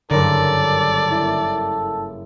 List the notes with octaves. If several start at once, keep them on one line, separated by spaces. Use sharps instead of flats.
F#1 G2 D3 A4 A#4 D5
A#3 E4